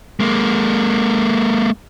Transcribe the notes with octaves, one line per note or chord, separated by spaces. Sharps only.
G#3 A#3